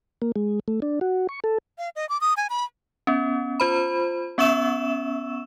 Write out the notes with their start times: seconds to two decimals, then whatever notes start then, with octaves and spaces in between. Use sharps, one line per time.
0.22 A#3
0.36 G#3
0.68 A3
0.82 D4
1.01 F#4
1.29 C#6
1.44 A4
1.78 F5
1.96 D#5
2.09 D6
2.21 D#6
2.37 G#5
2.50 B5
3.07 B3 C#4
3.60 F4 C5 B5
4.38 B3 C#4 E5 C#6 E6 E7